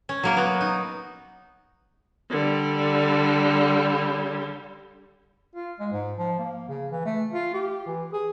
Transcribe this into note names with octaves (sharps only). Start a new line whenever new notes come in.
C#4
F#3 A#3 A#4
B3 F#4
D#4
D3 G3
F4
G#3
G#2
F3
A#3
C#3
E3
A3
F4
G4
E3
G#4